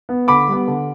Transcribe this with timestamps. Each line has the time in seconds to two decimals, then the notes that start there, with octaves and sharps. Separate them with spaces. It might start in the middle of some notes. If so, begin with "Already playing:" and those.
0.09 B3
0.28 D3 B5 D6
0.48 G3 B3
0.67 D3